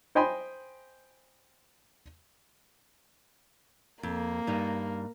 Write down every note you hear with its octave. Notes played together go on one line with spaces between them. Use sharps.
C5 D#5 G5 G#5 B5 C6
F2 A#3
G2 G3 D#4